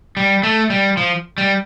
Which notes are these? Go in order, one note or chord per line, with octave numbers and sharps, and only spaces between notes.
G3
A3
G3
F3
G3